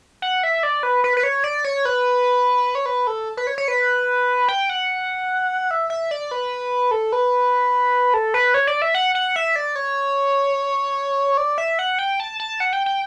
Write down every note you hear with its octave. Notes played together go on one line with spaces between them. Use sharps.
F#5
E5
D5
B4
B4
B4
C#5
D5
C#5
B4
C#5
B4
A4
B4
C#5
C#5
B4
G5
F#5
E5
E5
D5
B4
A4
B4
A4
B4
C#5
D5
E5
F#5
F#5
E5
D5
C#5
D5
E5
F#5
G5
A5
A5
F#5
G5
G5